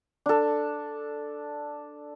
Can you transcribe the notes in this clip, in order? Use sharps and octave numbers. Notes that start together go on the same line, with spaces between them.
D4 A4